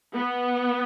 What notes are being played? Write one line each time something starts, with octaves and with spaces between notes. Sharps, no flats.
B3